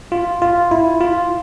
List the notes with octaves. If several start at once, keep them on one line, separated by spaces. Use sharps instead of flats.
F4
F4
E4
F4